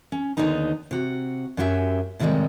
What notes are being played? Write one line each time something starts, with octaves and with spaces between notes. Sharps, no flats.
C#4
D#2 G#2 D3 B3 D#4 A#5
C3 F#4
F#2 F#3 C#4 G4 E5
A2 C3 D#3 F3 G3 G#3